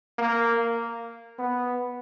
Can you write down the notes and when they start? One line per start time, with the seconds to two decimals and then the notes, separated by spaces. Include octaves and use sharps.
0.19 A#3
1.39 B3